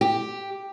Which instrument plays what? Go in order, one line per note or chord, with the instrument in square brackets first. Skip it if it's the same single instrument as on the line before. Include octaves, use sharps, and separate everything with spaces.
[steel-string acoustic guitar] G4